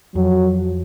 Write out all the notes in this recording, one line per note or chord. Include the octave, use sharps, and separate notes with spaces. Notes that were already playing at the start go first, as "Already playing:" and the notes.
F2 F#3